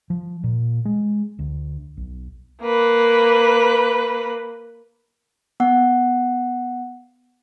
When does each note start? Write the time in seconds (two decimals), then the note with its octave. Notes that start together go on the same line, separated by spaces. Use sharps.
0.10 F3
0.44 A#2
0.85 G#3
1.39 D2
1.97 B1
2.63 A#3 B4
5.60 B3 F#5